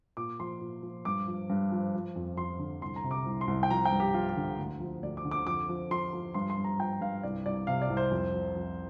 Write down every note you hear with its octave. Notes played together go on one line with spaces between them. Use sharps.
A#2 D6
F3 C6
A#2
F3
G2 D6
F3
G2
F3
F3
F2
F2 C6
D3
C2 C6
A#5
C3
D6
C2
C6
C2
G5
F3 A#5
G5
G2
G4
F3 F4
G4
D3
D2
F3
D2 D5
D6
D3
D6
F2 D6
F3
F3 C6
F3
G2 C6
C6
G2
A#5
F3 G5
G2 F5
C2 D5
C2 D5
C3 F5
D5
C2
C5
F2
F3
F2